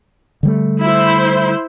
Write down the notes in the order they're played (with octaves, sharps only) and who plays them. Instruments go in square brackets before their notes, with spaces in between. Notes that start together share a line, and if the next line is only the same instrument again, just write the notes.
[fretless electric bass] D3 G3 A3
[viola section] E4 C5